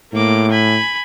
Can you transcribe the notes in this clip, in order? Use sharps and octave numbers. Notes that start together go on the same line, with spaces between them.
A2 A#3 D6
G#5 B5